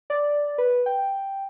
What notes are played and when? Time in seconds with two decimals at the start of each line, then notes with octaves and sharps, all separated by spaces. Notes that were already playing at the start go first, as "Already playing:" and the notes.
0.10 D5
0.58 B4
0.86 G5